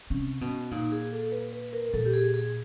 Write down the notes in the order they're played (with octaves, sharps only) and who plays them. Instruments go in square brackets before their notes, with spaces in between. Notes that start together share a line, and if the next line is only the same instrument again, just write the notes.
[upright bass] C3 [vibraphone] C#4
[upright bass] B2
[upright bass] A#2 [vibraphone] D#4
[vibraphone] G#4
A4
B4
B4
A#4
[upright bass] A#2 [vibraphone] A4
[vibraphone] G4
G#4
G#4